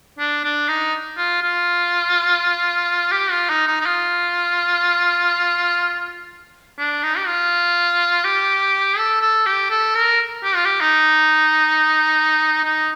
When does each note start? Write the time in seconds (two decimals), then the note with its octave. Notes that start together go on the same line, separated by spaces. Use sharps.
0.19 D4
0.44 D4
0.68 D#4
1.17 F4
1.42 F4
3.12 G4
3.31 F4
3.49 D#4
3.67 D#4
3.81 D#4
3.86 F4
6.78 D4
7.03 D#4
7.17 G4
7.27 F4
8.24 G4
8.98 A4
9.22 A4
9.46 G4
9.71 A4
9.95 A#4
10.44 G4
10.55 F4
10.65 G4
10.81 D#4
12.64 D#4